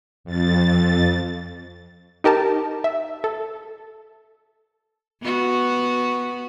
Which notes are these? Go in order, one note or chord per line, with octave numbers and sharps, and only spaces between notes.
F2 A6
D#4 G4 A#4 A5
E5
A4
B3 F#4